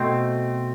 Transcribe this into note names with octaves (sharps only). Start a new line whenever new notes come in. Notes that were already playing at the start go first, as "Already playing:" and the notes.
Already playing: B2 A3 C4